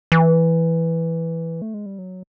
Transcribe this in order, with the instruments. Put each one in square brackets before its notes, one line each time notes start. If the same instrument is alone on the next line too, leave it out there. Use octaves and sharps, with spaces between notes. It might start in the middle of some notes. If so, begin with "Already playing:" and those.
[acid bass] E3
A3
G#3
G3
F#3